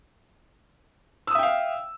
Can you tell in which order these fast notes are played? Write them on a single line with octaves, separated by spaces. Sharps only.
E6 D#6 E5 G5 F5